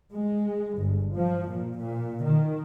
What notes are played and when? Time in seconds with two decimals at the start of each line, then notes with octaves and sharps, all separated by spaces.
0.14 G#3
0.77 G1
1.14 F3
1.49 A#2
1.78 A#2
2.23 D#3